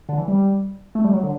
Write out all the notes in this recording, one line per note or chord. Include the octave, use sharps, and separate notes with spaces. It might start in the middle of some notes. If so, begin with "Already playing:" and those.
D3
E3
G3
A3
G3
F#3
D3